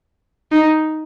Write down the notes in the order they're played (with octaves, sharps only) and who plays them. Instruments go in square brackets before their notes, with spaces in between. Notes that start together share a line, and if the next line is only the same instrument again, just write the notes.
[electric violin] D#4